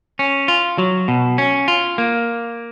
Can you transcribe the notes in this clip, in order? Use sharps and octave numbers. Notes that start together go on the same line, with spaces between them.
C#4
F4
F#3
B2
C#4
F4
A#3